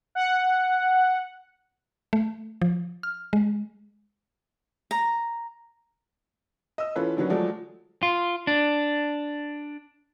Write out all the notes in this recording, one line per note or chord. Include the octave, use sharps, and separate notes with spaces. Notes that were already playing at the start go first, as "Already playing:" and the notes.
F#5
A3
F3
F6
G#3
A#5
D#5 E6
E3 C#4 F4 A4 B4
D3 D#3 F#3 C#4 B4
F3 F#3 G#3 A3 D5
F4
D4